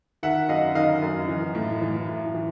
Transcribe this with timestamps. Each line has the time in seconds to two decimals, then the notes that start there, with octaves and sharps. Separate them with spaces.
0.23 D#3 E5 F#5
0.49 F#2 D#5 F5
0.75 D#3 D#5 F5
1.02 F#2
1.28 E3
1.55 A2
1.81 E3
2.08 A2
2.34 E3